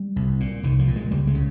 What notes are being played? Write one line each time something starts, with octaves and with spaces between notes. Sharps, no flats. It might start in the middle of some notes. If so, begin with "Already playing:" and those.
Already playing: G3
C2
A#2
C2 D#3
F3
A#2
G#3
C#2 G3
G#3
C#3